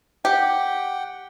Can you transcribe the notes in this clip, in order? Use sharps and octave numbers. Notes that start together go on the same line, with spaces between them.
G4 F#5 G5